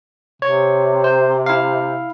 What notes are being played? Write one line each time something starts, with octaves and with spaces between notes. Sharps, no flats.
C3 C#5
C5
E4 F5